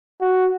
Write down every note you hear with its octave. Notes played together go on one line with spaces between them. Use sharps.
F#4